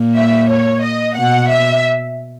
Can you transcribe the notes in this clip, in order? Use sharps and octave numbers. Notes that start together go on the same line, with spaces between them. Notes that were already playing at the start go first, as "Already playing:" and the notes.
Already playing: A#2
E5
C#5
D#5
B2 F#5
E5